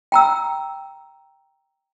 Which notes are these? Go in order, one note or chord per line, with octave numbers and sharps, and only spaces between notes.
G5 A#5 E6